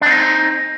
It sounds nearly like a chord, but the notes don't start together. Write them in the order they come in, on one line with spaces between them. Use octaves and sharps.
D4 C4 D#4